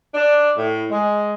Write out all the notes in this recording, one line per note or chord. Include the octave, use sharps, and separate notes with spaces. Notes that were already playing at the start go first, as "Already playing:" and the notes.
D4
A2
G#3